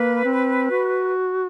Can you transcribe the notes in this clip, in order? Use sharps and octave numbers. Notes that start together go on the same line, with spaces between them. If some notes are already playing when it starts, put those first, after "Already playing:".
Already playing: A#3 B4
C4
F#4